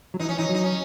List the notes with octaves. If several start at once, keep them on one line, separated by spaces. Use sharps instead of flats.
F#3
E3 D#4
C#4
E3 D#4
F#3
D#4
C#4